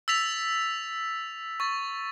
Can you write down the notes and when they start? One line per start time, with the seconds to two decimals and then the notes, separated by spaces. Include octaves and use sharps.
0.08 E6 A6 B6 F7
1.60 C#6 A6